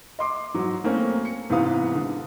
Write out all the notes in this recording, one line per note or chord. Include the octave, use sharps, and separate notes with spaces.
D#5 C6 D6
G#2 F#3
A3 A#3 C4 C#4
C#7
G#2 C3 E3 B3 F5 D#6
D3